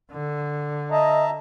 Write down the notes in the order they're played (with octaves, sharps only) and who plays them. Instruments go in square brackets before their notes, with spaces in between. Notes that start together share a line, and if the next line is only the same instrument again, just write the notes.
[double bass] D3
[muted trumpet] D#5 [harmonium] E5 A5 A#5